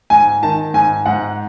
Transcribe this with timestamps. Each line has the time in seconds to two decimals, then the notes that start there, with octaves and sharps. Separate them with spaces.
0.10 G#2 G#5
0.43 D#3 A5
0.74 G#2 G#5
1.06 G#2 F#5